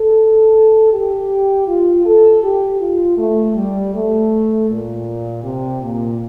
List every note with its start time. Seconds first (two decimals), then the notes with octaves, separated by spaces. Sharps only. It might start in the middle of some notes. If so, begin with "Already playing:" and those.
Already playing: A4
0.93 G4
1.68 F4
2.06 A4
2.43 G4
2.80 F4
3.18 A3
3.56 G3
3.95 A3
4.70 A#2
5.44 C3
5.82 A#2